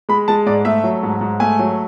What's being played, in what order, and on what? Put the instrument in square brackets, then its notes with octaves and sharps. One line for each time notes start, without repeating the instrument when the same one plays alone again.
[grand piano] G#3 B5
G#3 A5
G#2 D5
A3 E5
F#3
G#2
G#2
A3 G#5
F#3